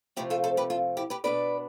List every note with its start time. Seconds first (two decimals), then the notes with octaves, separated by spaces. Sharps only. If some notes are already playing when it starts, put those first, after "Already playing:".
0.16 C3 F3 A3 C4 G4 B4
0.30 F4 A4
0.44 A4 C5
0.57 G4 B4
0.70 F4 A4
0.97 E4 G4
1.10 G4 B4
1.24 B2 B3 D4 B4 D5